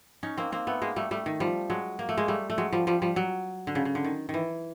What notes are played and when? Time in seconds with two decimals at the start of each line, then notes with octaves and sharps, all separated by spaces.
0.23 C#4 D#4
0.38 A#3 C4
0.52 A#3 C4
0.67 A3 B3
0.82 G#3 A#3
0.96 G3 A3
1.11 G3 A3
1.26 D#3
1.40 F3 G3
1.70 F#3 G#3
1.99 A#3
2.09 A3
2.17 G#3 A#3
2.28 G3 A3
2.50 A3
2.58 F#3 G#3
2.73 F3 G3
2.87 F3 G3
3.02 F3 G3
3.16 F#3
3.67 D3
3.75 C#3
3.85 C#3
3.95 D3
4.05 D#3
4.29 D#3 E3